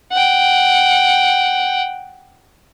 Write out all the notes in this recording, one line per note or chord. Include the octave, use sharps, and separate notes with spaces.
F#5 G5